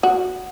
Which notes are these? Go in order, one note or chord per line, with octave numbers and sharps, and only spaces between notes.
F#4